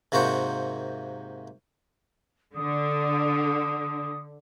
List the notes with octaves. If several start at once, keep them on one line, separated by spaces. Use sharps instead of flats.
G#2 C3 A#3 F#4 C5 C#6
D3 D#6